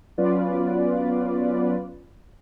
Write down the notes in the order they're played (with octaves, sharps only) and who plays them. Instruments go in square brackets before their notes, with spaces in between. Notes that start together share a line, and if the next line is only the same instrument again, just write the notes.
[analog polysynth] F#3 B3 C#4 F4 B4 D5